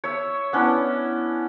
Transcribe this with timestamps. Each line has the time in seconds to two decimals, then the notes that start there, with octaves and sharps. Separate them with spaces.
0.04 C#5 E5
0.53 B3 C#4 D4 E4